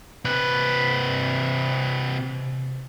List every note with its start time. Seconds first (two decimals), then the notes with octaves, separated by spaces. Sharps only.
0.25 C3 B4